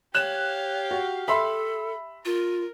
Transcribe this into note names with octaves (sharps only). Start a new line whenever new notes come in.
G4 C#5 F5 F#6 E7
F#4
A4 E5 B5 C6
F4 A#4